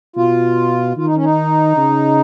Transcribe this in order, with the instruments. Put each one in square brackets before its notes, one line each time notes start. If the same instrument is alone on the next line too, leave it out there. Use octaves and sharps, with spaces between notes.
[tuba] B2 [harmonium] F4
[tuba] D#3 [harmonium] F4
[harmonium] D#4
C#4
D#4
[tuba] C#3